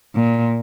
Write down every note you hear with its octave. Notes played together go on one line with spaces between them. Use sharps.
A#2